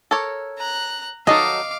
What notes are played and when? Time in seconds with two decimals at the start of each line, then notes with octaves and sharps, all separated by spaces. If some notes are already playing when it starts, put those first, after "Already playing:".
0.11 A4 A#4 C#5
0.58 A#5 F#6
1.27 F#3 D#4 A4 D#5 F5 D6